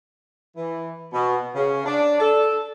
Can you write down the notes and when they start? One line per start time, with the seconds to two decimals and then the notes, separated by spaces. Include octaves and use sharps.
0.56 E3
1.13 B2
1.55 C#3
1.86 D4
2.20 A4